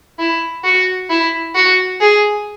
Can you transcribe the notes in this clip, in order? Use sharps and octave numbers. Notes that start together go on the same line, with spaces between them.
E4
F#4
E4
F#4
G#4